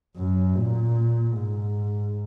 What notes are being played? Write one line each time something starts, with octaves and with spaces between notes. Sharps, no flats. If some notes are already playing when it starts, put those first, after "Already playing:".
F#2
A#2
G#2